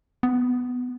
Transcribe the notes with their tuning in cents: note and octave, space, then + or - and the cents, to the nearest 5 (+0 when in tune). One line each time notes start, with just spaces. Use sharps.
B3 +10